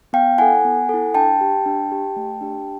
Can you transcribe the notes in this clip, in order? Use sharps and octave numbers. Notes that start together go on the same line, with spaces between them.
B3 F5 G5
E4 A4 F#5 G#5
B3
E4 A4
D4 G5 A5
G4
D4
G4
A3
D4 G4